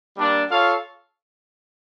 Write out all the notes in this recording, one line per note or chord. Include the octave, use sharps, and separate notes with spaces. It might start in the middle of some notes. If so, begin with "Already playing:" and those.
G3 A#3 D4
F4 A4 C#5 F5